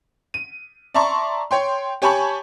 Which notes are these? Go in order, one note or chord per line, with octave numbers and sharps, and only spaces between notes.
D#7
D5 E5 A5 A#5 C6 C#6
C#5 G5 C6
G4 C#5 G#5 A5 B5 C#6